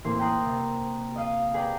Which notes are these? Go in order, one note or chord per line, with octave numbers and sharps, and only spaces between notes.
A1 E3 A#3 C4 C6 C7
G5 A#5 C6 D#6 F#6
C3
D#5 F5 D#7
G#4 B4 D5 G5 A#5